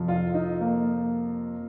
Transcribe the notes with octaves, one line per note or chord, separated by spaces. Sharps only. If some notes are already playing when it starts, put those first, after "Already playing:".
Already playing: F2 C3 F3
F4
D#4
A#3